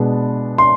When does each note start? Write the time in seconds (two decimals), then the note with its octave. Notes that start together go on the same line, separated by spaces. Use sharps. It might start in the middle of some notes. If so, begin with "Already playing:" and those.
Already playing: B2 G#3 B3 D4
0.58 C6